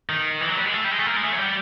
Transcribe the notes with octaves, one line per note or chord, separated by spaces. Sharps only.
D#3
E3
F#3
G3
G#3
A3
G3
G#3
A3
A#3
G#3
A3
F#3
G3